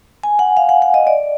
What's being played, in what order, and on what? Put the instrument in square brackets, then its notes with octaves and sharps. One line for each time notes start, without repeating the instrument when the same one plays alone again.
[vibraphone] G#5
F#5
F5
F#5
F#5
D#5
D5